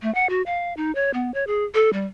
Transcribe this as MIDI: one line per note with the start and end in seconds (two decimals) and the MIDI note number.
0.02 0.13 57
0.15 0.29 78
0.29 0.42 66
0.46 0.73 77
0.77 0.93 63
0.95 1.11 73
1.14 1.31 59
1.34 1.44 73
1.47 1.64 68
1.74 1.90 69
1.93 2.05 55